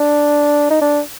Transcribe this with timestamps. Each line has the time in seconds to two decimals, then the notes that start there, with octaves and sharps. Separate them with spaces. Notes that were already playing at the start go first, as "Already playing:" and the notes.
Already playing: D4
0.70 D#4
0.81 D4